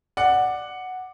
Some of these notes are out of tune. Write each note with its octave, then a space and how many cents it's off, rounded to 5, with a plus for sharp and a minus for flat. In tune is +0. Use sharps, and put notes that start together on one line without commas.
D5 +10 F#5 +0